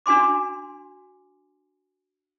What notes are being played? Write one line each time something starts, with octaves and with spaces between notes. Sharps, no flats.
D4 F#4 G#5 C6 D6